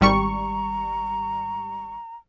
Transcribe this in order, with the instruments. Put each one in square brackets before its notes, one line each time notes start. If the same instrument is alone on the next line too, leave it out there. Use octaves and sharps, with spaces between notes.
[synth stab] G#1 G3 C#6 [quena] A#5